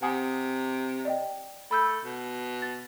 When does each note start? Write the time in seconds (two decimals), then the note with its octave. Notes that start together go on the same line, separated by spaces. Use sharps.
0.02 C3 F#5 G#5 D#6
1.05 D5 D#5 G5
1.71 A3 B5 E6 G6
2.05 B2
2.62 A6